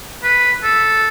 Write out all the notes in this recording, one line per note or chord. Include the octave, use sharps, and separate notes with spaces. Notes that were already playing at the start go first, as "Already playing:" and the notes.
B4
A4